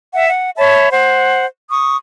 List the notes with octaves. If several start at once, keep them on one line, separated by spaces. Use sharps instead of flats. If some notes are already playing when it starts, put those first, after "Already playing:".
E5 F#5
F#5
C#5 E5 A5 B5
C5 F#5
C#6 D#6